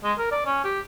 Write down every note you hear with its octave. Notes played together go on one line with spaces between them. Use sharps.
G#3
A#4
D5
C#4
G4